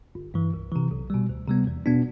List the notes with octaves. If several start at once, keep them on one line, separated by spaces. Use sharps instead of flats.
G1
G2 E3
C2
C3 E3
B1
B2 G3
D2
C3 G3 B3
E2
B2 B3 D4